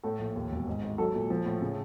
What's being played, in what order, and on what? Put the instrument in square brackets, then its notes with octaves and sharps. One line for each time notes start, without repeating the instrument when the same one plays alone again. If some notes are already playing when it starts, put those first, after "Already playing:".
[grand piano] A2 [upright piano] A4
[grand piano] A#1
D#2
E1
G#2
G#1
[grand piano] F#3 [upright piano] A4
[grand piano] A#2
[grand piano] F3 [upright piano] A4
[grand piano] A2
[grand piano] C#3 [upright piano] G#4